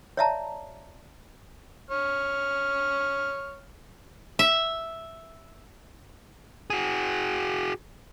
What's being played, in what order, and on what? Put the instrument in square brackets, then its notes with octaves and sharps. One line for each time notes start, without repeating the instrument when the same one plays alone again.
[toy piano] C#5 D5 E5 F5 A5 A#5
[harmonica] C#5 F6
[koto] E5
[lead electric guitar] F#4 G#4